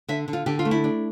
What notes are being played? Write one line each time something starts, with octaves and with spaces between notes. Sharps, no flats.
D3 E5
D3
F4
D3 G4
F4
A3
E4
D4